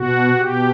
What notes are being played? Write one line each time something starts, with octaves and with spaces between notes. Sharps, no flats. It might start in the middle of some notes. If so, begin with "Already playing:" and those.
Already playing: B2 F#4
B2 G4